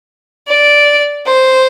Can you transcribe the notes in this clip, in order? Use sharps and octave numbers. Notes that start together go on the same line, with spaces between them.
D5
C5